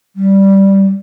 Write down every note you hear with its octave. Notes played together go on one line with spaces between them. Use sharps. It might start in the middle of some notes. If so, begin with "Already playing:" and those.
G3